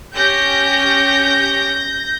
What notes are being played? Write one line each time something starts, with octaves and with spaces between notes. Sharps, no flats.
C#4 G4 G6 A#6